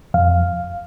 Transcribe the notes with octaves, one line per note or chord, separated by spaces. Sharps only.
F2 F5